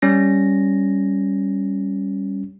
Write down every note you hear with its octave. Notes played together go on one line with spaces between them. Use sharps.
G3 C#4 A#6